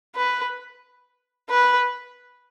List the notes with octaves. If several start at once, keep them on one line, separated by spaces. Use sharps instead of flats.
B4
B4